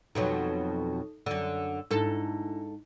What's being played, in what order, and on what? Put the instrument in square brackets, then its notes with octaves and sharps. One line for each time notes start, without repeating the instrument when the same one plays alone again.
[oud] F2 B2 F#3 [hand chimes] D#4 A4
[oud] F#2 D3 [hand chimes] E6
[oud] G#2 A4 [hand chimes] D4 E4